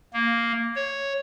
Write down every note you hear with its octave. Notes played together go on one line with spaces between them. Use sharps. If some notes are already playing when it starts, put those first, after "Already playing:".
A#3
C#5